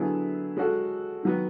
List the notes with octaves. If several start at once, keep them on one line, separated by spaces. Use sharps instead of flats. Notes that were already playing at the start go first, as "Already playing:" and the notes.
Already playing: D3 F#3 B3 E4 G#4
G#3 C#4 F#4 A4
D#3 F#3 B3